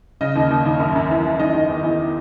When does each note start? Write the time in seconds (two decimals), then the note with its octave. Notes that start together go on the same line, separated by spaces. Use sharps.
0.21 C#3 D#5
0.36 D#2
0.51 D#2
0.66 D#2
0.80 F#2
0.96 F#2
1.10 E3
1.24 E3
1.39 D#3 D#5
1.54 D#3
1.69 E2
1.83 E2